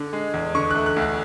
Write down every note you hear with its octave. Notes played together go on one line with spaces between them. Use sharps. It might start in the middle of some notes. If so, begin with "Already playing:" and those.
Already playing: D3
G#3
E2
D3 C#6
A3 F#6
F#6
D2
F#6